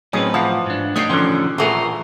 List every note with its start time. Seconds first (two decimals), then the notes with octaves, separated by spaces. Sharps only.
0.13 A2 F#3 C4 C#4 D#4 G#4 B4
0.34 E3 F3 F5 F#5 A5
0.66 G#2 D4
0.96 B2 A3 D4 D#4 C#5 G5 D#6 C7
1.10 A1 D3 D#3 F3 C#4 C6 F#6
1.58 A#1 E3 A3 F4 F#4 G#4 A#4